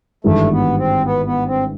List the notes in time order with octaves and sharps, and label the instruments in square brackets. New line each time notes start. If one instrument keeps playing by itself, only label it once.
[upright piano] G#1 G2 E3 G3 [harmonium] A3
[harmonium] B3
C4
B3
B3
C4